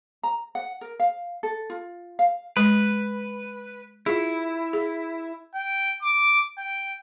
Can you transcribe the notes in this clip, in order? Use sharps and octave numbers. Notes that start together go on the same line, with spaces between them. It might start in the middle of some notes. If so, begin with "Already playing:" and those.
A#5
F#5
A#4
F5
A4
F4
F5
G#3 B4
E4 F4 G#4
G#4
G5
D6
G5